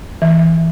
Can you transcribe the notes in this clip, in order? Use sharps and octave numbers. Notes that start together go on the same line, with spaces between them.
E3